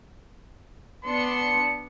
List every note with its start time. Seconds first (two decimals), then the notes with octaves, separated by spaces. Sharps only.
1.04 B3 D4 C6 C#7